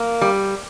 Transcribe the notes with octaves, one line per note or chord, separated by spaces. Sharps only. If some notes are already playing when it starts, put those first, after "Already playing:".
Already playing: A#3
G3